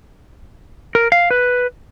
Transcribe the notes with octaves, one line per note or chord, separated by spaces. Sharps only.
A#4
F5
B4